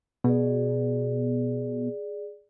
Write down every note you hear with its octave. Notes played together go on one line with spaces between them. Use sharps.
B2 G#4 D5